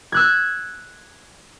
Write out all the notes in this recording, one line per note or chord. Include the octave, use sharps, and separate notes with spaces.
E6 F#6 G#6